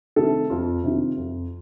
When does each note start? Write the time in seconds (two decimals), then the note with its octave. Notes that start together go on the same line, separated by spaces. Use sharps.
0.16 C3 D#3 A3 A4
0.50 F2 F4
0.84 C3 D#3
1.17 F2